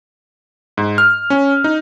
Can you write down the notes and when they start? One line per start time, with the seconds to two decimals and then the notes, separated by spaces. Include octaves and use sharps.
0.78 G#2
0.98 F6
1.30 C#4
1.64 D#4